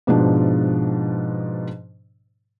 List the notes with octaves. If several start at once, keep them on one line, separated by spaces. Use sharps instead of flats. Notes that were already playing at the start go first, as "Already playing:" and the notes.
G#2 B2 F3 D4